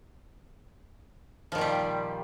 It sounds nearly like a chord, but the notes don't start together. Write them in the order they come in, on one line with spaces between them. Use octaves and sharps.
F3 D#3 A#2 G3